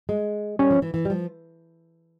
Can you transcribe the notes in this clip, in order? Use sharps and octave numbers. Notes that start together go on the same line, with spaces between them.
G#3
G3 C#4
F3
E3
E3
G3
F3